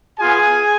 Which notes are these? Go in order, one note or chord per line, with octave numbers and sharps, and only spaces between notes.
B3 F4 G#4 G#5